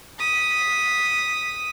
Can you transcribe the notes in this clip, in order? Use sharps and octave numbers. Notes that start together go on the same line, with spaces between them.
D#6 B6